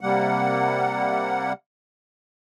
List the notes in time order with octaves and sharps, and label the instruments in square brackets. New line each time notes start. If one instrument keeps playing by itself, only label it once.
[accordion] C3 G3 A#3 F#5